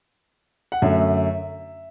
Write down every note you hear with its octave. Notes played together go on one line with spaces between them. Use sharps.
F#5
F#2 D3 F#3 A3 E5